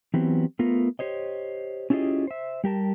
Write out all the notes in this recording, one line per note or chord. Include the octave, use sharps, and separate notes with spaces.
E3 F#3 B3 C4 G4
A3 B3 F4 A#4
G4 C5 C#5 D#5
C#4 E4 F4 G4 G#4 D#5
C5 E5
G3 G4 A#4 A5